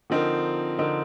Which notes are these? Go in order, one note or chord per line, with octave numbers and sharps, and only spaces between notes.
D3 F3 C4 D#4 A#4
D3 F3 C4 D#4 A#4